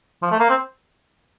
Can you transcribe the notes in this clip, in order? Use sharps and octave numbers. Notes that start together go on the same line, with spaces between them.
F3
A3
A#3
C4